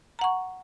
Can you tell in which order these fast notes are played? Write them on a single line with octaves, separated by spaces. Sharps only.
A#5 F#5 C#6